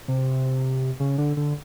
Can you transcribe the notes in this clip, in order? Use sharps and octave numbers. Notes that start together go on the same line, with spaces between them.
C3
C#3
D3
D3